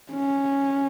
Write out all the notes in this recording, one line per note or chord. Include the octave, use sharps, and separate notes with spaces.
C#4